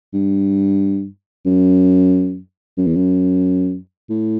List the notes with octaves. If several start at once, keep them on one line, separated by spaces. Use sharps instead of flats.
G2
F#2
F#2
E2
F#2
A2